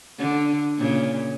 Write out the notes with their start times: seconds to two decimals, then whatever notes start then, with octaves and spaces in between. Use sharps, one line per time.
0.19 D3
0.77 A#2 C#3